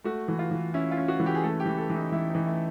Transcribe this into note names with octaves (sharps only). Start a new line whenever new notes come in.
A3 F#4
E3
F4
E3
C#4 E4
F4
C#4
F#4
E3
G4
G#4
A3 A4
G4
E3
A4
E3
D#4
E3 E4
E3 D#4
A3